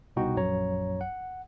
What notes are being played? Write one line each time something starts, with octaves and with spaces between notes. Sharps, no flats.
C2 B2 D#4 F#4 G5
A#1 F#2 F#3 C#5 A#5
F#5